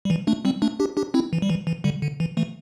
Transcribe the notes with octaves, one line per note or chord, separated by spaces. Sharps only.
G3
E3
A3 D4
G3 C4
A3 D4
D4 G4
D4 G4
C4 E4
E3
G3
E3
E3
D3 G3
D3
E3
E3 A3